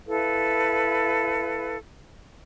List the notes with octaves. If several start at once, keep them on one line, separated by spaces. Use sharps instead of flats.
E4 A4 B4 F5